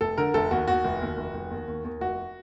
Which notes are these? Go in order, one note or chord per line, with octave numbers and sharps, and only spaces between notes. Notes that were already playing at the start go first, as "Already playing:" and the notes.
F1 A4
D3 A#4
F1 A4
D#2 F#4
D#2 F#4
F1
D#2
F1
F1
D#2
D#2
D#2
F1 F#4